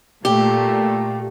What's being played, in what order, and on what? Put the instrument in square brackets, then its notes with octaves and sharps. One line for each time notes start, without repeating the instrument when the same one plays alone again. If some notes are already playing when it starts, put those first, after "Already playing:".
[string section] A#2 A3 [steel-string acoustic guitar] G4